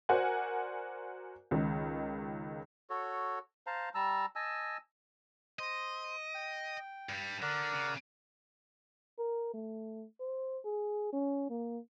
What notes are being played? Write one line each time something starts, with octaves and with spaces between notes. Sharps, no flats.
F#4 A#4 C5 D5 F#5 G#5
C#2 D#3
F#4 A4 C#5
C5 F5 A5 A#5
G3 A5 A#5 E6
D#5 G#5 A5 E6
C5 D#5
G5
G2 G3
D3 A#4 D5 F#5
C#3
A#4
A3
C5
G#4
C#4
A#3